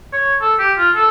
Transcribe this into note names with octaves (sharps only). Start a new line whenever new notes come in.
C#5
A4
G4
F4
A4